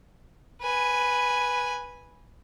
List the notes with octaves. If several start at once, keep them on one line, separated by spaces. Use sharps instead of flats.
B4 G#5